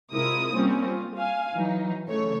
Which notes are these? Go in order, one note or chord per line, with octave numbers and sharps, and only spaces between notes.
C3 G#3 E4 F4 A#4 D#6
G3 A#3 C4 C#4 F4
F4
F5 G#5
E3 F#3 D#4
C#3 E3 A3 C#5